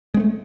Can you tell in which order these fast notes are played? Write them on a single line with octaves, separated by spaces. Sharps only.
G#3 C4 A3